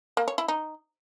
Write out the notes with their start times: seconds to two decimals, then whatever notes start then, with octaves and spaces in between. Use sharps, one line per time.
0.17 A#3
0.28 C#5
0.38 E4
0.48 D#4